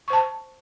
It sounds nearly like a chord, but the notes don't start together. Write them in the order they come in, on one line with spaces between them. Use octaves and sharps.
C#6 C5 A5